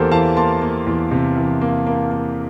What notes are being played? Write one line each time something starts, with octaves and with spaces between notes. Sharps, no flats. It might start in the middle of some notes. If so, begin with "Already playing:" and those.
Already playing: E2 A#3 G4 A4 A#4 C5
E3 F5 A5
A#3 A5 C6
A#3
E2
C3
E3
A#3
A#3
A#3